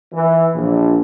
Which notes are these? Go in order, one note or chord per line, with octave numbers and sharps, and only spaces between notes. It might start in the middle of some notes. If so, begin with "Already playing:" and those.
E3
A#1